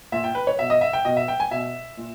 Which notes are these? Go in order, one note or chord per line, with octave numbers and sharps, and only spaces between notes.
A#2 E5
G5
B4
C#5
B2 E5
D#5
E5
G5
B2 D#5
E5
G5
G#5
B2 E5
A#2